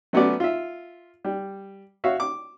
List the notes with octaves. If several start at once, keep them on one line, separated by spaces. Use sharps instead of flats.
F#3 A3 B3 C#4 F#4 D5
F4 E5
G3
F#4 C#5 E5 F5
D6